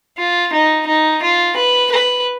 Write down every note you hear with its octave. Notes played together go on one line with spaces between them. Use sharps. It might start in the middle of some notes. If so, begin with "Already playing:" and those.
F4
D#4
D#4
F4
B4
B4